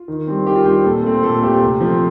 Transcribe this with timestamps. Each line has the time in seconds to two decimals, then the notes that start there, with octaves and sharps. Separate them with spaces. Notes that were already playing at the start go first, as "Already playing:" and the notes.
Already playing: F4
0.08 D#3
0.27 G3 C4
0.46 D#3 G4
0.56 F4
0.65 G3 C4 G4
0.84 A#2 A4
1.04 A3 C4
1.23 A#2 A4
1.42 A3 C4 G4
1.61 C3
1.80 F3 A3 C4